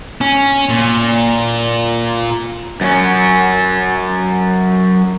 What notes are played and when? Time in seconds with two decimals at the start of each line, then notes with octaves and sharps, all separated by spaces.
0.21 C#4
0.69 A#2
2.81 F#2 C#4